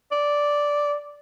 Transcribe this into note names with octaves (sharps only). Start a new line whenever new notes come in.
D5